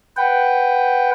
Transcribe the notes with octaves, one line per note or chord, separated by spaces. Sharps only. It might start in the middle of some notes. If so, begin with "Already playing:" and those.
B4 F#5 G5